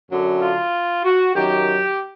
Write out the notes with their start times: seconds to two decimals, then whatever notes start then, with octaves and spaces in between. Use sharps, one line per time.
0.10 F#2 D3 F#3
0.42 F4
1.05 F#4
1.35 F#2 D#3 F#3 G4